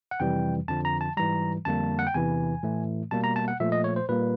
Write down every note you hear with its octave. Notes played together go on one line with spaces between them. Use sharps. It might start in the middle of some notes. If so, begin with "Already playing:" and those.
F#5
F2 C3 E3 G3 G5
F2 D3 F3 A5
A#5
A5
G#2 E3 G3 A#5
F2 D3 G3 A#3 A5
F#5
G5
E2 C3 E3 G#5
A2 E3 A3
B2 G3 A#3 A5
A#5
A5
F#5
A#2 F3 A3 E5
D#5
C#5
C5
A#2 G3 A#3 B4